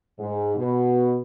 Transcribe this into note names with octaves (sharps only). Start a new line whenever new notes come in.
G#2
B2